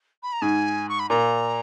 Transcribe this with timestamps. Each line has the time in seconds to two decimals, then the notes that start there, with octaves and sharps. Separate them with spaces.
0.23 B5
0.33 A#5
0.42 G#2 G#5
0.89 C#6
1.00 B5
1.09 A#2 A#5